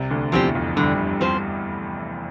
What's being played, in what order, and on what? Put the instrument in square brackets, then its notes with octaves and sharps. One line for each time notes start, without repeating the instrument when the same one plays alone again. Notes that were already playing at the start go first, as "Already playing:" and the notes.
Already playing: [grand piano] C2 C3
D2 D3
[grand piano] E2 E3 [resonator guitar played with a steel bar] F3 C4 G4 C5
[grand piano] F2 F3
[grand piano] G2 G3 [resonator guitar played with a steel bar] D3
[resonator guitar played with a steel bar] F3 C4 G4 C5